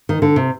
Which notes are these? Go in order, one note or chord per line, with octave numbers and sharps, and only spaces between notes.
D#3
D3
C3